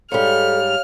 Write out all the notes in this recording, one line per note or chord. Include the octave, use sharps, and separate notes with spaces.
G#2 G3 A4 C#5 F5 F6